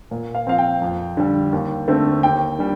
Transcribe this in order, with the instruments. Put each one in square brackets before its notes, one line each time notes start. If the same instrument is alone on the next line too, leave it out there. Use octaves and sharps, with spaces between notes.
[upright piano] A#2
F5
F3 C4 F5
G5
F2
D3 G3
D#2
D3 A3 C4
D#2 G5
D3 G3